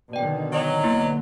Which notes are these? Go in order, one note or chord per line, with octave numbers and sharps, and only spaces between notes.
B2 D3 D#3 D5 G5
F#3 D#5
B1 D3 A#3 B3 E4